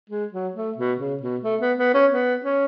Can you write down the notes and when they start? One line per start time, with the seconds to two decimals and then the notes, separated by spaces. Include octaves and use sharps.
0.10 G#3
0.33 F#3
0.56 A3
0.78 B2
1.00 C#3
1.22 B2
1.44 A3
1.61 B3
1.78 B3
1.95 C#4
2.11 B3
2.44 C#4